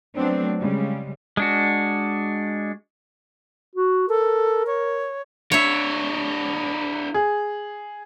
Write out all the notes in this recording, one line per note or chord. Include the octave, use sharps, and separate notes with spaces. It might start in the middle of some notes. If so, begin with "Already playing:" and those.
F#3 A3 B3 C4 D4
C#3 G3 G#3
G#3 D4 F#4
F#4
A4 A#4
C#5
D4 E4 C#5 E5
G#4